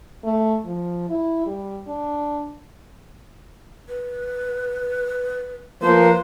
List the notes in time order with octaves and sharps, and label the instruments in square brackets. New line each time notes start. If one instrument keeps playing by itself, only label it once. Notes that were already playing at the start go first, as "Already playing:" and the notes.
[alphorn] A3
F3
E4
G3
D4
[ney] B4
[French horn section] F3 A#3 [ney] B4 [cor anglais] C5